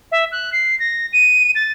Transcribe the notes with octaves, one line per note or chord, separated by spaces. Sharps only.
E5
F#6
C7
A#6
D#7
A6